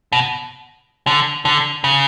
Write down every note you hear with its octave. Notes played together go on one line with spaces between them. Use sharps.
B2
D3
D3
C#3